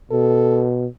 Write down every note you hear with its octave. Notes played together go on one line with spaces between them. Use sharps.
B2 A4